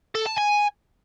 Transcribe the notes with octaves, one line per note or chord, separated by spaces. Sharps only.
A4
A5
G#5